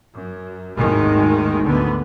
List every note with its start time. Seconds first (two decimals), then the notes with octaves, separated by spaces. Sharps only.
0.14 F#2
0.77 G#1 D#2 A2 D#3 G#3
1.64 D2 G#2 D3 B3